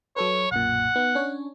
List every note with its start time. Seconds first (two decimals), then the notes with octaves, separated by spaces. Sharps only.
0.16 F#3 A4 B4 C#5
0.52 B1 F#2 A#2 F#5
0.96 B3 D#4
1.15 C#4 D4 C#5